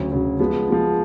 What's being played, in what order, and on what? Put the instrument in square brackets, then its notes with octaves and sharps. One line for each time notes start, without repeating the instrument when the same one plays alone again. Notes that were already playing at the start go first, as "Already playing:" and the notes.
Already playing: [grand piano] D2 C#3 F#3
D2 C#3 F#3
F3 G#3 B3
F3 G#3 B3